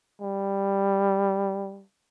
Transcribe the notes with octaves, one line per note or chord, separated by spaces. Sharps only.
G3